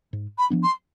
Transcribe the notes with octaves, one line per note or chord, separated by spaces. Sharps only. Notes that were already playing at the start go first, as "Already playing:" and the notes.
G#2
B5
F3 B3 D4
C6